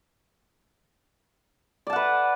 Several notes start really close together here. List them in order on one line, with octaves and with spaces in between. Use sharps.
D5 A5 F#5 B4